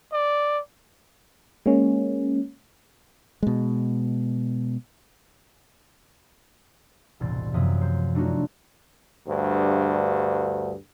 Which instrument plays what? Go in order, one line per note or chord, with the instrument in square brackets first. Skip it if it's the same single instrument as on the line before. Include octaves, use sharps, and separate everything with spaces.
[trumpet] D5
[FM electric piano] G#3 A#3 C#4
[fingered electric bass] B2 G#3
[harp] E1 C2 A2 C6 A6
F#2 C3 F3 A#3 E5 D#6
C5
F#3 A3 D4 D#4 F4 F#4
[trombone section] D2 G2